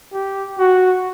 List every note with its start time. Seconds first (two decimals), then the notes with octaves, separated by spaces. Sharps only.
0.13 G4
0.59 F#4